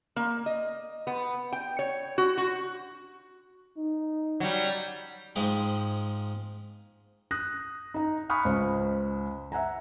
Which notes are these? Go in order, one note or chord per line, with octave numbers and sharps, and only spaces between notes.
A#3
D#5
B3
G5
C#5
F#4
F#4
D#4
F#3 G3
G#2 F3 G#3 G5 B5
D#6 F#6 A#6
D#4 A#5
G#5 B5 C#6 D#6 F6 F#6
C#2 C5
E5 F#5 G#5 A#5